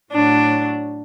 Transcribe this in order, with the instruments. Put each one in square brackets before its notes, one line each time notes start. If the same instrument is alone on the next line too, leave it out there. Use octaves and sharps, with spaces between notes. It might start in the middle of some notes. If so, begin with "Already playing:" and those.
[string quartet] A2 F#3 D4